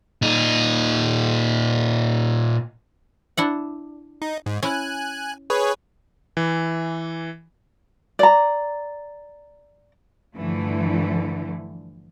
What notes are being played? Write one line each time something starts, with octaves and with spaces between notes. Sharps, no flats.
A#2 D#4
D4 E4 F#5
D#4
G#2
C#4 E4 G#5 F#6
G#4 B4 C#5
E3
D5 A#5
G2 D3 E3 F3 A3